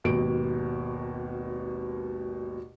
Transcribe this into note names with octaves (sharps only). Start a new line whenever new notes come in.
G#1 D#2 B2 D7